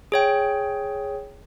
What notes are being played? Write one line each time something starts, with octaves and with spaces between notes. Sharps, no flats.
G#4 C#5 G5